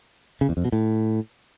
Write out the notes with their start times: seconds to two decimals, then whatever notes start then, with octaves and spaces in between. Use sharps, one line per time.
0.41 C#3
0.49 E2
0.57 F2
0.65 B2
0.72 A2